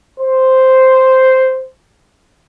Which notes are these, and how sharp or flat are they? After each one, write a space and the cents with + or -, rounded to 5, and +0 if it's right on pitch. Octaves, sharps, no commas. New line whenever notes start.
C5 -5